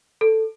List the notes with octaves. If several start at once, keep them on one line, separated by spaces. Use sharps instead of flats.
A4